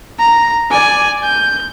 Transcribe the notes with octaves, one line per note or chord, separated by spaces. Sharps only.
A#5
D5 G#5
G6